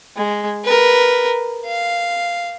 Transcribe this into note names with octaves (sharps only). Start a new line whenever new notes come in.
G#3
A#4 B4
F5